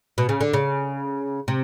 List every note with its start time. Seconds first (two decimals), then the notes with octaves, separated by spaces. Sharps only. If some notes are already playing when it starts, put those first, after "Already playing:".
0.18 B2
0.29 C#3
0.41 D3
0.53 C#3
1.48 C3